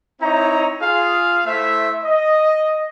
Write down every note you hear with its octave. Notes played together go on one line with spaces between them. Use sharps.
C4 D#4 E4 C#5 E5 A#5
F4 G#4 F5
A3 E4 C5 E5
D#5